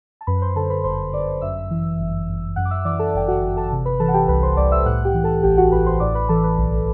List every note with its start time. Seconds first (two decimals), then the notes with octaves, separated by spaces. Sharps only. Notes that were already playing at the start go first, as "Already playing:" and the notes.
0.21 A5
0.27 F#2 B4 B5
0.42 C5 C6
0.56 D3 A4 A5
0.70 B4 B5
0.84 G1 C5 C6
1.13 G1 D5 D6
1.41 F#2 E5 E6
1.71 E3
1.99 G1
2.28 G1
2.56 F#2 F#5 F#6
2.65 D6
2.71 E5 E6
2.85 E3 D5 D6
2.99 A4 A5
3.14 G1 G5
3.28 F#4 F#5
3.42 G1
3.57 A4 A5
3.72 C3
3.85 B4 B5
4.00 E3 A4 A5
4.08 F#5
4.14 G4 G5
4.28 C2 B4 B5
4.43 C5 C6
4.57 C2 D5 D6
4.72 E5 E6
4.86 A2 F#5 F#6
5.05 G4 G5
5.14 E3
5.24 A4 A5
5.43 A1 G4 G5
5.57 F#4 F#5
5.72 A1 B4 B5
5.86 C5 C6
6.00 A2 D5 D6
6.15 B4 B5
6.29 E3 A4 A5
6.44 B4
6.58 B1